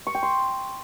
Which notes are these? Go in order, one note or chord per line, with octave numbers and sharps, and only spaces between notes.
C#6
G5
C6